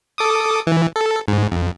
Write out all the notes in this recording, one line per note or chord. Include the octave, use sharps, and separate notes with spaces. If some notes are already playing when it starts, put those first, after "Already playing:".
A4 D6 D#6
E3
A4
G#2
F2